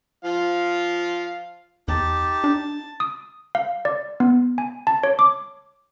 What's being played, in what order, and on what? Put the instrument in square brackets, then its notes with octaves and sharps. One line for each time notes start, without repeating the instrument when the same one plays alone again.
[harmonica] F3 F5
[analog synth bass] E2 [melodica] D#4 G4 [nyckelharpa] A5
[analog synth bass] D4
[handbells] D#6
F5
D5
B3
G#5
A5
C#5
D6